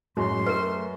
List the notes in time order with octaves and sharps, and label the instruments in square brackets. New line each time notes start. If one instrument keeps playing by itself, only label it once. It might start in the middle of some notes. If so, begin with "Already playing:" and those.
[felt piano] F#2 [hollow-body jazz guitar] A2 G#3 [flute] C6
[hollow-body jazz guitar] A3 [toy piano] A#4 B4